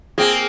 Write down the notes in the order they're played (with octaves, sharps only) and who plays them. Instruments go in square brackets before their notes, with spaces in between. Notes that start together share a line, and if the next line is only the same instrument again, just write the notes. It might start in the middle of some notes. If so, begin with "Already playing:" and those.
[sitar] A#3 C4 [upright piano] G#4